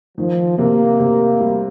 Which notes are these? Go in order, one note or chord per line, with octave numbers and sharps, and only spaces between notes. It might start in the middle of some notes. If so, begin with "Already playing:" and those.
D#3 F3
C3 A#3
C3
G3